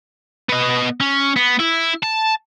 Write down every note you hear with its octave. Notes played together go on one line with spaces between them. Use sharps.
B3 D#5
C#4
B3
E4
A5